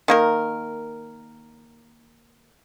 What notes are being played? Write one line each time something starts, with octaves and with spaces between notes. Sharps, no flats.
D#3 A#3 A#4